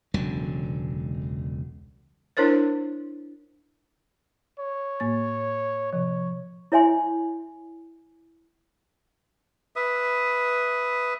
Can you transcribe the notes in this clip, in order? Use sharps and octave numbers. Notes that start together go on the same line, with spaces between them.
E1 C#2 D3 F#3
D4 E4 A#4 C5 C#5
C#5
A2 A#3 A6
C3 F3 C#5
E4 C#5 E5 G#5 C6
B4 E5 D#6